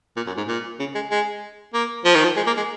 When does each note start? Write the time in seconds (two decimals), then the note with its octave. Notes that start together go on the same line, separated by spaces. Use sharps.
0.16 A#2
0.27 F#2
0.37 G#2
0.48 A#2
0.79 C#3
0.95 G#3
1.11 G#3
1.74 A#3
2.05 F3
2.15 D#3
2.24 F3
2.36 G#3
2.47 A#3
2.57 G#3